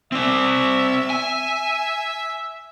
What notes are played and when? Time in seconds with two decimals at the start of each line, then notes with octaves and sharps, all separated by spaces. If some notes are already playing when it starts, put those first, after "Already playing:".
0.12 C4 D5 E5
1.10 G#5